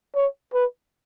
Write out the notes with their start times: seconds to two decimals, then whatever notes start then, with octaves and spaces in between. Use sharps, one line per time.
0.15 C#5
0.54 B4